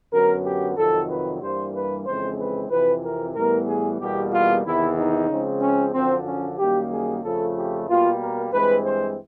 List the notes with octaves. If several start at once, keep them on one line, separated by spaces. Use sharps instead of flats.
F#2 D3 F#3 B3 A#4
G4
F2 C3 D#3 F#3 A4
B4
G2 E3 G3 A#3 C5
B4
F2 C#3 E3 G#3 C4 C5
B4
F2 C3 E3 B4
A#4
A2 E3 G3 B3 A#4
G#4
E2 B2 G3 A#3 G4
F4
E2 C3 D#3 E4
D#4
C#3 F3 G#3 C4
C#4
F#2 D3 F3 C4
C#4
F#2 D#3 G3 A#3 G4
G#4
F2 C#3 F3 A3 A4
G4
B2 G3 A#3 F4
A#4
G2 E3 G#3 C4 B4
C5